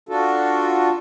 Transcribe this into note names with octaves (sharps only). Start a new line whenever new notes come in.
D4 F4 F#4 A4